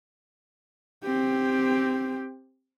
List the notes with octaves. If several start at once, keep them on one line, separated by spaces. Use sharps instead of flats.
C4 G4